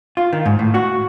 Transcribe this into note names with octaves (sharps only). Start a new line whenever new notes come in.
F4
D#3
G#2
A2
F#4